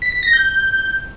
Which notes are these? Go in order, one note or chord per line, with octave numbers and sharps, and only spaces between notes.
B6
B6
A#6
G6